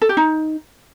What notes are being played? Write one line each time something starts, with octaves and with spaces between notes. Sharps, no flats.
A4
G4
D#4